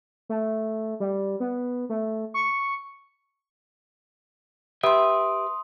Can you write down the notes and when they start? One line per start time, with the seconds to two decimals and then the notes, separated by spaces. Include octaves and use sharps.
0.29 A3
1.00 G3
1.40 B3
1.89 A3
2.34 C#6
4.83 G4 B4 E5 C6 D#6